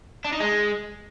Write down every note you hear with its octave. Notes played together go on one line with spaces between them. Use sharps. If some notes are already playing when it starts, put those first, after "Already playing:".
D4
D#4
G#3